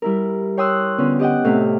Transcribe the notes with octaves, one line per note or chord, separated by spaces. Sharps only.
G3 E4 A#4
C#5 G5 C6 D#6 E6 F#6
D3 B3 C#4 F4
G4 D#5 F#5 G5
A2 C3 A3 F5